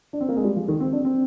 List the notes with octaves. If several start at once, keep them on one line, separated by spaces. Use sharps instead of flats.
D4
C4
A#3
G#3
G3
F3
D#3
C4
D4
C4